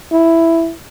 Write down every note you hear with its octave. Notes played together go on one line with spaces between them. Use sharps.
E4